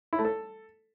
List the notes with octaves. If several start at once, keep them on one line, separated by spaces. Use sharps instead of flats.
E4
A3
A4